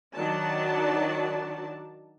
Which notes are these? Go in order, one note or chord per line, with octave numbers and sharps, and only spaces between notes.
D#3 F#3 D4 F#4 D5 A5